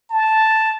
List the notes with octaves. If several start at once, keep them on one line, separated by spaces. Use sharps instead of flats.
A5